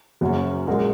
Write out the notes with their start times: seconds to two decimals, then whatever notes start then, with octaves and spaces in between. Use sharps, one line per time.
0.21 F#1 F#2 F#3 C#4 F#4
0.67 A#1 A#2 G#3 F#4 A#4